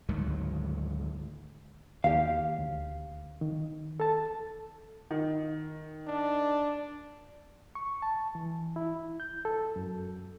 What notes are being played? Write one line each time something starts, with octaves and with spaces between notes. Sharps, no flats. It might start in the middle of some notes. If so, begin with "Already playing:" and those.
D2 G#2 D#3 F#3
D#2 G4 F5
D2
D#3
A4 A5
D#3
D4
C#6
A5
E3
E4
G6
A4
F#2